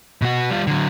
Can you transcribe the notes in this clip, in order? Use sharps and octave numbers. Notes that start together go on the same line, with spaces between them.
B2 F#4
G3 F4
D3 F#3